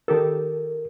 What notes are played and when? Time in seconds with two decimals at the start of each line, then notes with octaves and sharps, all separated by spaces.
0.08 D#3 G4 A4 A#4